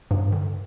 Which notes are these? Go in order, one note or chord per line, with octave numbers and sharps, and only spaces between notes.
G2
D3